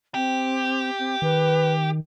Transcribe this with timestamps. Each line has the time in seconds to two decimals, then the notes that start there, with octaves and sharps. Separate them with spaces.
0.14 C4 G4
0.99 C4
1.22 D#3 B4